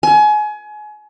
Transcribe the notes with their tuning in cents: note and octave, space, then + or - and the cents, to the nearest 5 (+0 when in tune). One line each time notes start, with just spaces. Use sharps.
G#5 +30